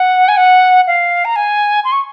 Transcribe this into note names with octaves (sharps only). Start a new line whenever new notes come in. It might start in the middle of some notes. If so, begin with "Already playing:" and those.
Already playing: F#5
G#5
F#5
F5
A#5
G#5
C6
C#6